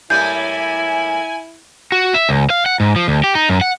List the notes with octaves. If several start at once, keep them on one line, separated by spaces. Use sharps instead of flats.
A2 G3 A#3 E4 G#5 G6
F#4
E5
C#2
F5
F#5
G#2
F3
D2
G4
D#4
F#2
F#5